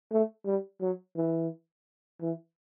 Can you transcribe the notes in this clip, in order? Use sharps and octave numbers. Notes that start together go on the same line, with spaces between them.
A3
G3
F#3
E3
E3